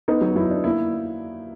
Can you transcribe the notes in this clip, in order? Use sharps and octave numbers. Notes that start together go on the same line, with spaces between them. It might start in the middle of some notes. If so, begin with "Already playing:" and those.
B3 D#4
F#3
F#3 E4
D4
A#3 E4